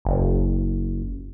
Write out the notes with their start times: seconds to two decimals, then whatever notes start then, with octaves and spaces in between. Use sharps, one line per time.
0.05 F#1